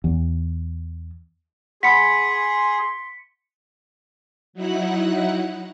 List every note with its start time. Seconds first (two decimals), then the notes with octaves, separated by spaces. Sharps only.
0.04 E2
1.83 G#4 F#5 B5 C6 D6 B6 C#7
4.53 F#3 D#4 E4 F#5 F#6